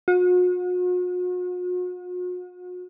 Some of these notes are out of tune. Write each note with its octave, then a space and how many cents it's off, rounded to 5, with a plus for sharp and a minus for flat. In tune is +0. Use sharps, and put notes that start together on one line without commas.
F#4 -45